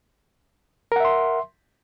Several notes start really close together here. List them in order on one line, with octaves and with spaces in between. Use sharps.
A#4 F#5 E5 C6